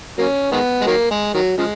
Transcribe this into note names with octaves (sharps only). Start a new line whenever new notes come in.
F#3 A#3 C#4
D#3 G#3 B3
G#3
D#3 F#3 A#3
G#3
D#3 F#3
C#3 F3 G#3